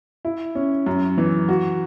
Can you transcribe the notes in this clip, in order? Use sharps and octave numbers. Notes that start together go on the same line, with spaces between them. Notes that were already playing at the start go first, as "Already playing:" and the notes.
E4
C#4
F#2
E3
F#4